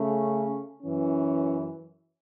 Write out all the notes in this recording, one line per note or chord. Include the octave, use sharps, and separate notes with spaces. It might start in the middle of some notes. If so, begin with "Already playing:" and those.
Already playing: C#3 A3 C#4
F#2 E3 C#4